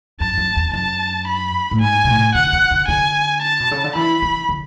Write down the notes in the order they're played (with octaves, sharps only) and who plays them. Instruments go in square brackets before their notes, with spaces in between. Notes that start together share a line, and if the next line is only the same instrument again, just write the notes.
[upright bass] F#2 [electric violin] A5
[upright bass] F#2
E2
[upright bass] F#2 [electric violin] A5
[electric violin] B5
[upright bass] A2
[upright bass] G#2 [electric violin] G#5
[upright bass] B2
A2
[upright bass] D3 [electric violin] F#5
[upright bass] D3
D3
[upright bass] D3 [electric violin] G#5
[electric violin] A5
[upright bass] B2
C#3
D3
[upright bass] E3 [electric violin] B5
[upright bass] E3
D3